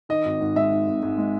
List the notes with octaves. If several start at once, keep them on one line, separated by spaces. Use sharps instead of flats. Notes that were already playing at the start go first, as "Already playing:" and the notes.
D#3 D#5
G#1
G#2
G#3 E5
D#3
G#1
G#2
G#3